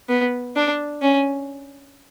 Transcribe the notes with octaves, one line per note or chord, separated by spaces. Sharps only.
B3
D4
C#4